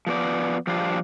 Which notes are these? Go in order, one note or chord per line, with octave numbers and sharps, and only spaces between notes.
F3 B3 D5
F3 G3 D4 F5